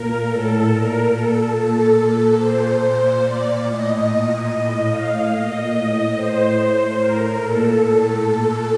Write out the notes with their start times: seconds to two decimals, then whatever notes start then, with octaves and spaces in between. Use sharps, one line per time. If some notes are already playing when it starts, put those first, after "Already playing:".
Already playing: A#2 A#4
0.27 A2 A4
0.69 A#2 A#4
1.11 A#2 A4
1.53 A#2 A4
1.95 A#2
2.37 A#2 C5
2.78 A#2 C5
3.20 A#2 D5
3.63 A2 D#5
4.05 A#2
4.46 A2
4.88 A2 F5
5.30 A#2 D#5
5.72 A2
6.13 A2 C5
6.56 A2
6.98 A2 A#4
7.39 A#2 A4
7.81 A2
8.24 A#2